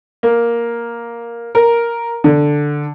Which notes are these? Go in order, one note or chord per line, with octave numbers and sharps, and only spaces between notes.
A#3
A#4
D3